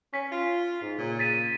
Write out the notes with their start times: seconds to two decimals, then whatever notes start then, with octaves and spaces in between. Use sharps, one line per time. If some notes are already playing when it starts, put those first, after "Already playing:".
0.14 C#4 B6
0.32 F4
0.82 G#2
0.99 A#2 C#3
1.19 A6 B6 D#7